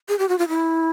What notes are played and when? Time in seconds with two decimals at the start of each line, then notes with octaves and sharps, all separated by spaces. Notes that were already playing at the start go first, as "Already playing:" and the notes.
0.09 G#4
0.19 G4
0.29 F#4
0.38 F4
0.48 E4